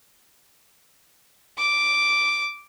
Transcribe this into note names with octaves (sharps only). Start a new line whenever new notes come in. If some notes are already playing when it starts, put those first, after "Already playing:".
D6